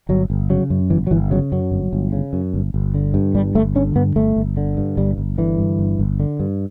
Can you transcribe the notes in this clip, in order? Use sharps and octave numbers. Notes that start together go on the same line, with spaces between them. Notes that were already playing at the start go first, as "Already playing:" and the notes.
G1 F#3
G1
C#3 F#3
F#2
G1 E3
F#3
G1 E3
C#3 F#3
F#2 F#3
G1
G1
C#3
F#2
G1
G1
D3
G2
G1 G3
G1 A3
D3 C#4
G2 B3
G1 A3
G1
D3
G2
G1 G3
G1
D3 E3
G2
G1
G1
D3
G2